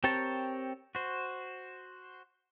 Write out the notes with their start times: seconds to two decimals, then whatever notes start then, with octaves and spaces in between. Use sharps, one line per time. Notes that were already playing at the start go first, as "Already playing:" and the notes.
0.04 C4 G4 A#4 C#5 A5
0.95 F#4 C5